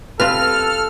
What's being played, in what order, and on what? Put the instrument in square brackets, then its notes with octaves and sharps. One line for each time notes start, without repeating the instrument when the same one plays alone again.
[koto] G3 C4 F4 [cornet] A4 [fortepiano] B4 [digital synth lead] F6